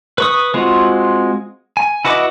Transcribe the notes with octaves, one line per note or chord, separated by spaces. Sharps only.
B4 C#6 D#6
G#3 C4 F4 F#4
G#5
E4 F#4 B4 D#5 D6